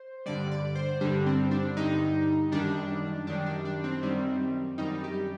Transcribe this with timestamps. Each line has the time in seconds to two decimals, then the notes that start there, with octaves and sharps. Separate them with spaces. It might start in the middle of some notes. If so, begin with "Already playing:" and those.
Already playing: C5
0.26 G2 D3 G3 D5
0.52 D5
0.75 C5
1.01 G2 D3 G3 D4
1.26 C4
1.51 D4
1.77 G2 D3 G3 D#4
2.52 F#2 D#3 G3 D4
3.27 F#2 D#3 G3 D4
3.46 D4
3.65 D4
3.84 C4
4.03 F#2 D#3 G3 C4
4.78 F#2 D#3 G3 D#4
5.04 G4